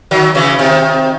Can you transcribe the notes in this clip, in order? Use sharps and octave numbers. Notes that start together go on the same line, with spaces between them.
D#3 F#3
C#3 E3
C3 D#3